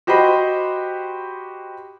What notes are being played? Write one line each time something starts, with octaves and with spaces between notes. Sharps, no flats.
F#4 G4 C5 D#5 B5 C6